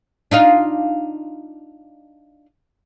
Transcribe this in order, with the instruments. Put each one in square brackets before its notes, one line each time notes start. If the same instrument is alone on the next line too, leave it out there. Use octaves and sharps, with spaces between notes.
[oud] D4 D#4 F4